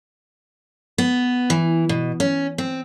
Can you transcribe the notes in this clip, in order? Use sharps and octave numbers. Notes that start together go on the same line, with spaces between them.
B3
E3
B2
C#4
C4